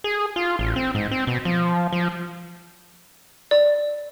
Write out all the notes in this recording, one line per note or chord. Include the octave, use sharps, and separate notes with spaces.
G#4
F4
A1
C4
G#2
C4
B2
F3
F3
D5